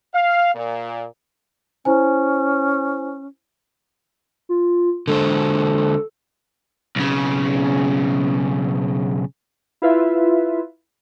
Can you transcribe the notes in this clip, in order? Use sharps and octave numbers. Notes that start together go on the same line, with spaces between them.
F5
A#2
C#4 E4 C5 G#5
F4
D3 G#3 A4 C5
B1 C#3
E4 F4 B4 E5